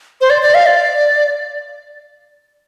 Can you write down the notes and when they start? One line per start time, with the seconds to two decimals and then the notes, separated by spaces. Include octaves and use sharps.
0.21 C5
0.30 D5
0.42 D5
0.54 F5
0.66 D5